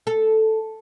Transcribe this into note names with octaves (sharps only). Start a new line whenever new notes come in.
A4